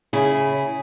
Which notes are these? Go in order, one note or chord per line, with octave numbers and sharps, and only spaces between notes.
C#3 E4 G#4